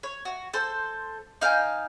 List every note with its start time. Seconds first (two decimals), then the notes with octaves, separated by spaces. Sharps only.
0.03 C#5
0.25 F#4
0.53 A4 C5
1.41 D#4 F5 G5 G#5